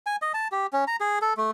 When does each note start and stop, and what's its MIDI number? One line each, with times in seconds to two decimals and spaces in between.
0.06 0.16 80
0.22 0.32 75
0.34 0.48 81
0.52 0.66 67
0.73 0.84 61
0.87 0.96 82
1.00 1.19 68
1.22 1.34 69
1.37 1.51 57